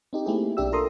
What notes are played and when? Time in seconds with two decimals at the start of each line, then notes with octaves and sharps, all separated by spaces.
0.13 C4 D#4 G4
0.26 A3 A#3 C4 E4 G4 G#4
0.57 B1 D4 G4 E5 E6
0.72 F4 A4 A#4 A#5 C6 D#6